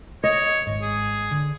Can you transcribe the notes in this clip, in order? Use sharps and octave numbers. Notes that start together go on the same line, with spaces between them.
C#5 D#5
G#1 G#2
G#4
D3